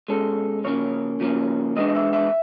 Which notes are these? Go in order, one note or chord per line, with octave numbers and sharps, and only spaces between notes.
B2 G#3 C#4 A4
C#3 F3 A#3 C#4 C#5
C#3 F3 A#3 C#4
E3 G#3 B3 D4 D#5
D#5
E5
E5